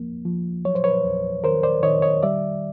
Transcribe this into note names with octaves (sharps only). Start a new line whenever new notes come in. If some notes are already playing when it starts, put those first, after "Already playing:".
Already playing: E2 F3 A#3
F3
F#3 C#5
C5
B4 C#5
E2
D#3 A#4 C5
C5 D5
D#3 C#5 D#5
C#5 D#5
G3 D5 E5